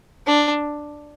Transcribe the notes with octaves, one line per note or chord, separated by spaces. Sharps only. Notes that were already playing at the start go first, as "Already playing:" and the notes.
D4